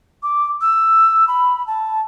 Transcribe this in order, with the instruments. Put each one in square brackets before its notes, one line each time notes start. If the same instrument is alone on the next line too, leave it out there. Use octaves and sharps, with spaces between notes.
[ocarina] D6
E6
B5
A5